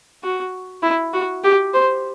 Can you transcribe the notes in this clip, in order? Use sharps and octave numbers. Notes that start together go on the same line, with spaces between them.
F#4
E4
F#4
G4
C5